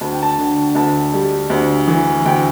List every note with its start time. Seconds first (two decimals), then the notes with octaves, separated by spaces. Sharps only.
0.01 D2 A5
0.12 G5
0.22 A5
0.38 D3
0.75 D2 A5
1.13 G3
1.50 D2
1.87 E3
2.25 D2 G5